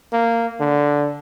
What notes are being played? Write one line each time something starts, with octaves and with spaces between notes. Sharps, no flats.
A#3
D3